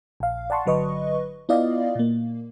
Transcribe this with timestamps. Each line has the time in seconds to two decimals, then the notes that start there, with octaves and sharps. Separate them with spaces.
0.20 A#1 F5
0.50 D5 F#5 A5 C6 C#6
0.66 G1 D3 F#3 B4 D#5 C#6
1.49 B3 E4 F4 D5 D#5 F5
1.95 A#2 A#3